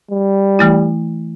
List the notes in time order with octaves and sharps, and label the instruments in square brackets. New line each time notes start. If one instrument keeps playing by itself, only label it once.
[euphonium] G3
[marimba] E3 A3 E4